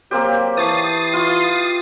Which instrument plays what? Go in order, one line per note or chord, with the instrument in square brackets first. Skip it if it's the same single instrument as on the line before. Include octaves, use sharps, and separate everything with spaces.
[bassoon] F#3 [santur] A#3 C4 G4
[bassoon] E3 [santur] C#5 A5 [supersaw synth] D#6 A6 C7
[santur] F4 C6